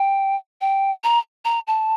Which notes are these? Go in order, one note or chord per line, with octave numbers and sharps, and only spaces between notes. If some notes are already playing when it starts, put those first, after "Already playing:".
Already playing: G5
G5
A#5
A#5
A5